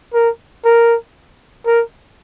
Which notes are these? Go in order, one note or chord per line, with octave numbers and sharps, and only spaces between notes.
A#4
A#4
A#4